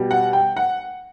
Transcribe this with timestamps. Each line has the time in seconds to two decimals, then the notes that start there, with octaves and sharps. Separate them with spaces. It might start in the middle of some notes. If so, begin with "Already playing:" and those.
Already playing: B2 G3
0.11 F#5
0.33 G5
0.57 F#5